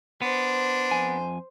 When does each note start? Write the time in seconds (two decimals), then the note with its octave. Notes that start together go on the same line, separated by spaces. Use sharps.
0.22 B3 D4 C5
0.91 F2 G#5